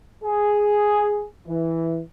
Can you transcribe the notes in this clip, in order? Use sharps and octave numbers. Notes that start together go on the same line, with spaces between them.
G#4
E3